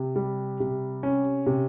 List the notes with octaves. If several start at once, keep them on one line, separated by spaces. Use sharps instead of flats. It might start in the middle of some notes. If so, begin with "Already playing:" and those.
Already playing: C3
G3
C3
C#4
C3